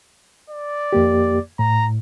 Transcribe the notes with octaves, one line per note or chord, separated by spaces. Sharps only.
D5
F2 A#3 G4
A2 A#5